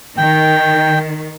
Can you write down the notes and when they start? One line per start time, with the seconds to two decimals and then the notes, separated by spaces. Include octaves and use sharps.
0.18 D#3 G5